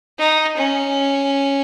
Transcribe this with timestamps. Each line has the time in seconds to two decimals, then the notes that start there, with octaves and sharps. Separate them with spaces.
0.18 D#4
0.57 C#4